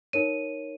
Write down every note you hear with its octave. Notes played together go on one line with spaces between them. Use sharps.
D#4 A#4 C#5 D#7